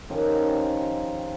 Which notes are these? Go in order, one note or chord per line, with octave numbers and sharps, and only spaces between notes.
D#3 F3 C#4 G4